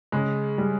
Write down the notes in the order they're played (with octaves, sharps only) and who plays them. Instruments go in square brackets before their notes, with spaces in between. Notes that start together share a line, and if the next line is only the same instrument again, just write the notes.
[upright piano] C#3 [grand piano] G#3
[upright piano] G3